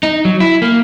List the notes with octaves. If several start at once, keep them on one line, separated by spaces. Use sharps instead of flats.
D#4
F#3
E4
A#3